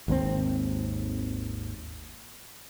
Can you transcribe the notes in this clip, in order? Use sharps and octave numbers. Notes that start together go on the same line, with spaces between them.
G#1 D#2 B2 C4